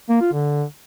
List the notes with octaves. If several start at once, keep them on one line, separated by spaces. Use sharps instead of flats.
A#3
F4
D3